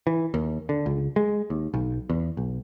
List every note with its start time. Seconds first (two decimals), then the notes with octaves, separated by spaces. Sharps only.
0.07 E3
0.34 D#2
0.69 D3
0.86 C#2
1.16 G#3
1.50 D#2
1.74 B1
2.10 E2
2.37 B1